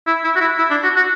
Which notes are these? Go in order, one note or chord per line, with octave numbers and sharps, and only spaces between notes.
E4
E4
F#4
E4
E4
D4
F#4
F#4